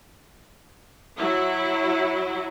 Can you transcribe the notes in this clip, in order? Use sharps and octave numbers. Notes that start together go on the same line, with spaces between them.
F#3 E4